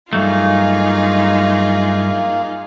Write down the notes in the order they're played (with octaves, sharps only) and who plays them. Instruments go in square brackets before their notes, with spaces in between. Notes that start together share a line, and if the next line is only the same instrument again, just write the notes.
[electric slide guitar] G2 F#3 A3 [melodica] A#3 [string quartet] D#4 F4 G#4